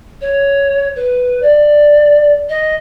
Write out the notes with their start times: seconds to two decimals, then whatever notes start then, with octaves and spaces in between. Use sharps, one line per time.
0.21 C#5
0.96 B4
1.42 D5
2.49 D#5